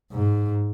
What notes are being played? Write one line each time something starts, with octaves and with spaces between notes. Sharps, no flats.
G#2